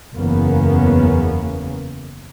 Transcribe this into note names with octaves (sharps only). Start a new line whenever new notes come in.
F#1 E2 C#3 A#3 B3 C#4